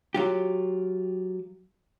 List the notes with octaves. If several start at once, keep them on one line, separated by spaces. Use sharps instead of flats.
F#3 F4 G4